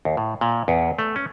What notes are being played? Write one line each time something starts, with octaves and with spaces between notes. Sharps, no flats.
D#2
A2
A#2
E2
A3
C#4